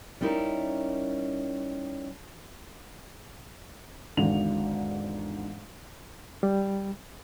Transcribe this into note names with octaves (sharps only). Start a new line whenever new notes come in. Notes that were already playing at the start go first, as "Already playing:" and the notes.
G3 C#4 D#4 E4 A#4
G#1 E2 G#2 D3 F7
G3